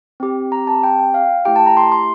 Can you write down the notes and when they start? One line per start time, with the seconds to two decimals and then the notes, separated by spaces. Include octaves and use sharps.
0.20 C4 G4
0.52 A#5
0.67 A5
0.83 G5
0.99 G5
1.14 F5
1.45 A3 E4 G4 G5
1.56 A5
1.66 A#5
1.77 C6
1.92 C6